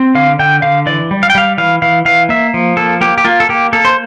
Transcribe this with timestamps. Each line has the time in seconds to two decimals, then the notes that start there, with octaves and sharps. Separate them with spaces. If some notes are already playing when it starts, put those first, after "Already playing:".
Already playing: C4
0.15 D3 F5
0.39 D3 G5
0.62 D3 F5
0.86 E3 D5
1.11 G3
1.23 F5
1.30 G5
1.35 G3 F5
1.58 E3 F5
1.82 E3 F5
2.05 E3 F5
2.29 A#3 E5
2.54 F3
2.77 A#3 A4
3.01 A#3 G4
3.18 G4
3.25 A#3 F4
3.40 A4
3.49 A#3 G4
3.73 A#3 A4
3.85 C5